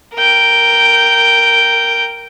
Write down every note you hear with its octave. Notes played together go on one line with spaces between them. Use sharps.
A#4 G5